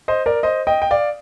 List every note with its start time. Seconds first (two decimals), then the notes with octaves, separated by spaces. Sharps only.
0.08 C5 D#5
0.26 A#4 D5
0.43 C5 D#5
0.67 D#5 G5
0.82 G5
0.91 D5 F5